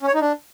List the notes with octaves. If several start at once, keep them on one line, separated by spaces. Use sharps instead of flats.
C#4
C#5
D#4
D4